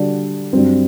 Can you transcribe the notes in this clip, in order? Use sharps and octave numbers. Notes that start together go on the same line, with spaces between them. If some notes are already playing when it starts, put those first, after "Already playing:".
Already playing: D3 G3 D4 F#4
G2 F#3 C4